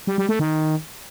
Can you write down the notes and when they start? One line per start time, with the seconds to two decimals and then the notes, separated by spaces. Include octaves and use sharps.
0.07 G3
0.18 G3
0.29 A3
0.39 D#3